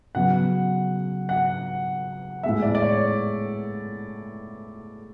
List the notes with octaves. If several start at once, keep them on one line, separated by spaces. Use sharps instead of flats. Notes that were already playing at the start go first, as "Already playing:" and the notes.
C#3 F#3 B3 F#5
F#5
A2 G#3 B3 E5
D5
D5
C#5